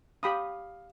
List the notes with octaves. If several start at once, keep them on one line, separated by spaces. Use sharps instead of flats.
G4 F5 B5 D#6